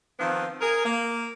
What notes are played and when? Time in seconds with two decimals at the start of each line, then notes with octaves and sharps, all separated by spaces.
0.19 D#3 F3 B3 C4
0.61 G#4 A#4
0.84 A#3